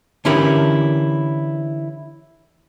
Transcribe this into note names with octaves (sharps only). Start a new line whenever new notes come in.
D3 E3 C#4 E4 G4 A#4